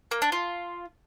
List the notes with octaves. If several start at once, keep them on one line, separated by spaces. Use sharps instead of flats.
A#3
D4
F4